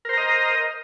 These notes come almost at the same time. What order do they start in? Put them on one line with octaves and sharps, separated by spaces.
A#4 C5 A#5 D#5